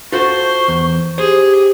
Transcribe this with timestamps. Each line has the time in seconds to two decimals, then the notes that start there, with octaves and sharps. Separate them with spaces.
0.12 F4 F#4 A4 C5 C#6
0.68 E2
1.18 G4 G#4 C5